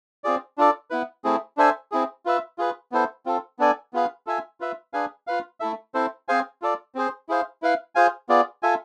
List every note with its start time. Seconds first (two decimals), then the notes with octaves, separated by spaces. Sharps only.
0.24 C4 F4 G#4 D5
0.58 D4 F4 A4 D5
0.90 B3 E4 B4
1.24 A3 C4 E4 G#4
1.57 D4 A4 C5 E5 G#5
1.92 C4 E4 G#4
2.25 F4 B4 E5
2.58 F4 G#4 B4
2.92 B3 E4 A4 C5
3.26 C4 F4 A4
3.59 B3 D4 A4 D5 G#5
3.93 B3 F4 G#4 B4 F5
4.27 F4 A4 E5 G#5
4.60 F4 B4 E5
4.93 D4 G#4 B4 F5 G#5
5.27 F4 B4 F5
5.60 A3 E4 A4 E5
5.94 C4 E4 A4 C5
6.28 C4 G#4 C5 F5 G#5
6.62 F4 A4 D5
6.95 C4 G#4 C5
7.29 E4 G#4 C5 F5
7.62 E4 B4 F5
7.95 F4 G#4 C5 F5 G#5
8.29 B3 F4 G#4 D5
8.63 F4 A4 E5 G#5